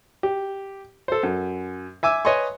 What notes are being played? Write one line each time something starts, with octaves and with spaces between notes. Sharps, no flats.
G4
A4 C5
F#2
E5 G#5 D6 E6
B4 C#5 D#5 G#5 C6 C#6